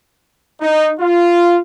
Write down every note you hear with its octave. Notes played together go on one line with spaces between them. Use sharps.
D#4
F4